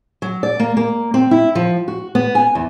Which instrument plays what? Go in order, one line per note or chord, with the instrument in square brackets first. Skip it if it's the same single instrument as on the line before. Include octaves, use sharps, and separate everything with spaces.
[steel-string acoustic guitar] F#3
D5
A#3
A#3
C4
E4
F3
F#4
B3
G#5
E2